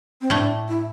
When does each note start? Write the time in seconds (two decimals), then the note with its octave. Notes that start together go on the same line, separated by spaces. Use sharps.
0.21 C4
0.30 A2 A3 D4
0.69 E4